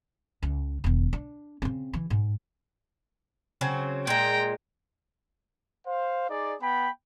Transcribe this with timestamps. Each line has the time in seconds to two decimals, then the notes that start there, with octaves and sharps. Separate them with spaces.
0.43 C#2
0.84 E1 D#3
1.13 D4
1.62 C#3 C4
1.93 E3
2.10 G#2
3.61 C#3 F#3 C4
4.07 A#2 G#3 G5 A#5
5.86 C5 F5
6.29 D#4 G#4 D5
6.61 B3 G5 B5